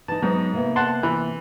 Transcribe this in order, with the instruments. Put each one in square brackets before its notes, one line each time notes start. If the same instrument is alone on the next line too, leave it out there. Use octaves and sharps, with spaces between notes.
[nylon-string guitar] E3 D#4 [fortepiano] A5
[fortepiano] G#2 [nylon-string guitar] F#3 B3 D#4
[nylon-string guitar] C3 A#3 B3
[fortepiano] F#5 A5 C6
E3